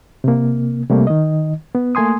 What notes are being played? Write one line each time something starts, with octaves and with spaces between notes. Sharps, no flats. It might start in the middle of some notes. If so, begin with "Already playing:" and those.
C3 A#3
C3 G3 A3 A#3
D#3 D#5
B3
A3 A#3 G#5 C6 D#6